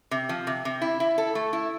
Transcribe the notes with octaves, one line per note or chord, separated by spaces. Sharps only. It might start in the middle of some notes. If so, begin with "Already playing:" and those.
C3
F3
C3
C3
E4
E4
A4
A3
E4